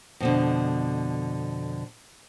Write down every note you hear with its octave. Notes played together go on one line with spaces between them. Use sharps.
F2 B2 D3